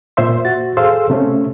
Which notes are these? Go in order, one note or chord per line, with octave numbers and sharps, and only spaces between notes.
A#2 C5 E5 C6
F#4 A6
G#4 A4 C5 F5 C6 E6
C3 A3 C#4